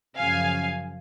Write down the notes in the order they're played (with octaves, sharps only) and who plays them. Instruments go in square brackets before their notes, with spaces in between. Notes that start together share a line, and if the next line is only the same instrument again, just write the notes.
[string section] F#2 C#3 F3 F5 G#5